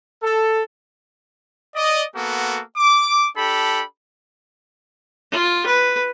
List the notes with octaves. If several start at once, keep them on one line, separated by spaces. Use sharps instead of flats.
A4
D5 D#5
A#3 B3 F#4 A4
D6
D4 G4 A4 B5
F4
B4